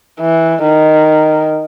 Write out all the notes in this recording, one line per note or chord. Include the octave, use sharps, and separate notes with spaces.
E3
D#3